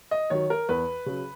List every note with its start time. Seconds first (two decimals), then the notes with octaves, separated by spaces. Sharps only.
0.11 D#5
0.30 D#3 F#3 C#5
0.50 A#4
0.69 E2 B4
1.06 C#3 F#3